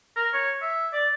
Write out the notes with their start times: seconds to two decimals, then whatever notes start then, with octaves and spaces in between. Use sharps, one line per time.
0.16 A#4
0.34 C#5
0.62 E5
0.93 D5